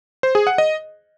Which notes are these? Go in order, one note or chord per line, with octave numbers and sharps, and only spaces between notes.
C5
G#4
F#5
D#5